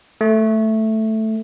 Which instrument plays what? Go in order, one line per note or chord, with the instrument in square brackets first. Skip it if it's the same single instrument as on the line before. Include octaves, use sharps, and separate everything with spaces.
[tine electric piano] A3